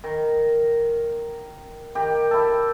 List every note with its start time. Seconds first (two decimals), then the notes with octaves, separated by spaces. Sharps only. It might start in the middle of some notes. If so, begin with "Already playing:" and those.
0.04 D#3
1.95 D#3 G4
2.31 E4 G4 A4